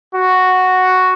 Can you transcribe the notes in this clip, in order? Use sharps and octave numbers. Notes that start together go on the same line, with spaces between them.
F#4